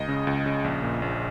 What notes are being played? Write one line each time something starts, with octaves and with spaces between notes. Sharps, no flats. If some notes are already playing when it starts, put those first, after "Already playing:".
Already playing: C#2 D#5
C#3
C#2
C#3
A#1
A#2
A#1